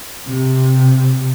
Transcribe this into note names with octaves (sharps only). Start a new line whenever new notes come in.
C3